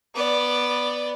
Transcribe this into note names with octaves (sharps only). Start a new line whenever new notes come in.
B3 D5